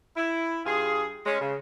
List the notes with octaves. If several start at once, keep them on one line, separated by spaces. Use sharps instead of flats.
E4
G2 F4 G#4
G#3 C#4
C#3